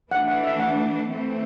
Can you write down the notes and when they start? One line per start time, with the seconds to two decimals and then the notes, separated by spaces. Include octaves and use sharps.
0.11 E3 A3 D4 F#5
0.28 F#5
0.44 E5
0.60 F#5
1.08 E3 A3 C4